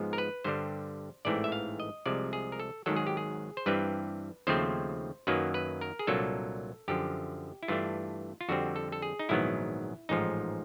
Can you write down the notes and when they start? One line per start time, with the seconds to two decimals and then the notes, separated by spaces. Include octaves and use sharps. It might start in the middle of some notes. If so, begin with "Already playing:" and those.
Already playing: G#2 F3 G#3 B3
0.13 A#4
0.18 B4
0.44 G2 D3 G3 C5
1.25 A1 G#2 E3 A3 C4 D5
1.44 E5
1.52 F5
1.80 D#5
2.06 C2 C3 F3 G#3 D5
2.33 G#4
2.52 A#4
2.60 A4
2.86 G#1 G#2 D#3 F#3 A4
2.96 G#4
3.07 G4
3.17 G#4
3.57 C5
3.66 G2 E3 G3 C4 B4
4.47 D#2 C#3 F3 A3 C4 C5
5.27 F#2 D#3 F#3 A#3 B4
5.54 B4
5.81 A#4
5.99 G#4
6.07 C2 A#2 F#3 A#3 D4 A4
6.88 F#2 D3 F3 G4
7.63 E4
7.68 G2 E3 A3 D4 F4
8.41 F4
8.49 F2 D3 G3 C4 F#4
8.76 A4
8.92 A4
9.02 G#4
9.19 D#4
9.29 A#1 G#2 D#3 F#3 B3 E4
10.09 A1 G#2 F3 D#4